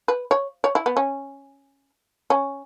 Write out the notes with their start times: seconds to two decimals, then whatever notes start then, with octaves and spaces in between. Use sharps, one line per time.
0.08 B4
0.31 C#5
0.64 C#5
0.75 E4
0.86 B3
0.97 C#4
2.30 C#4